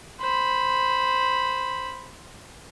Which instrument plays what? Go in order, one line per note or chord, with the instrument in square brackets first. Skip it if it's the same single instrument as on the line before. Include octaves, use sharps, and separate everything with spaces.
[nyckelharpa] C5 B5